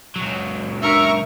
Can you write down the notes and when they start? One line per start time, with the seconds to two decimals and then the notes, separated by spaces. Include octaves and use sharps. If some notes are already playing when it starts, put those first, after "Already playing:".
0.16 C#2 F#3
0.82 D4 A#4 E5 C#6